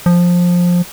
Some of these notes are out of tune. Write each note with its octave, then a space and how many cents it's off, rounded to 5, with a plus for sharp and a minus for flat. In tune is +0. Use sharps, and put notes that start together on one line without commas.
F3 +15